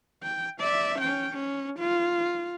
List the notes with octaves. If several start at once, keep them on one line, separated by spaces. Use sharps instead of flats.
G5
D5 E5
C#4 G5
C#4
F4